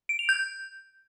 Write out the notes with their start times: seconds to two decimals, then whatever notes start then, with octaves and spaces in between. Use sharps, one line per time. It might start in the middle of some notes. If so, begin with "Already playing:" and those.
0.09 D7
0.19 F7
0.29 G6